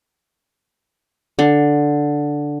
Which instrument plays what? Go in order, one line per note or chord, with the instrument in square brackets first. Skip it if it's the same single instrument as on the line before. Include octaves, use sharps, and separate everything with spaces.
[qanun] D3